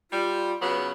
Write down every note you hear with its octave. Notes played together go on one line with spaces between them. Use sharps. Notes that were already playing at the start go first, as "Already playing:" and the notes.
G3 F4
C#3 F#3 B3